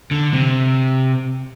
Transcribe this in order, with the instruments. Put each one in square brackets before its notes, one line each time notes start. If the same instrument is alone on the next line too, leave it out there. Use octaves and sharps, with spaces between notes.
[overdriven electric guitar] D3
C3